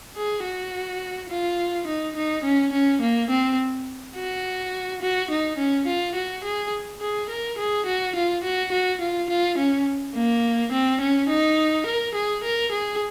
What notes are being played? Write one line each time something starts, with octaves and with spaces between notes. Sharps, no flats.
G#4
F#4
F4
D#4
D#4
C#4
C#4
A#3
C4
F#4
F#4
D#4
C#4
F4
F#4
G#4
G#4
A#4
G#4
F#4
F4
F#4
F#4
F4
F4
C#4
A#3
C4
C#4
D#4
A#4
G#4
A#4
G#4